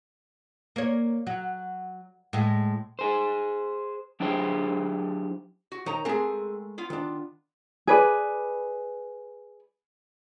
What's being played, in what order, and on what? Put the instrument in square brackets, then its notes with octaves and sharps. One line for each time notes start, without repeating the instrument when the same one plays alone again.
[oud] A#3 C#5
F#3
A2 G#3
[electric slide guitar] G#4 C5
F#3 D4 E4 G4 G#4 C5
[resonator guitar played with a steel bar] F#4
[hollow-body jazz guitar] D#3 C#5 [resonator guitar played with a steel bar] D#4 A#5
[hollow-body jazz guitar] G#3 A3 A#4 [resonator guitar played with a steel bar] C4 G#4
[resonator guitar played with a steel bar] B3 F4
[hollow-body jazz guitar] D#3 D4
[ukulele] G#4 B4 D5